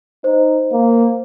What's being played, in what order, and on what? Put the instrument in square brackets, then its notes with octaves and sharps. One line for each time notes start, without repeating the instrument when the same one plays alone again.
[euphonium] D#4 [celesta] C5
[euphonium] A#3